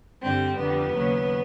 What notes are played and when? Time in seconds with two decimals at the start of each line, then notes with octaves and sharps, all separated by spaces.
0.21 G2 D3 G3 C4
0.57 F2 D3 G3 B3
0.93 D#2 C#3 F#3